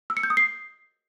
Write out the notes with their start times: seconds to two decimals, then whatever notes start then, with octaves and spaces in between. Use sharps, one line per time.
0.10 E6
0.17 C#7
0.23 G6
0.30 D#6
0.37 C7